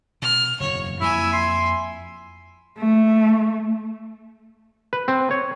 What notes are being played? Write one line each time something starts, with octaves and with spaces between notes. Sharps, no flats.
B2 F6
F#1 E2 C#5
F2 A#3 E4 E5 G#5
C6
A3
B4
C4
C#5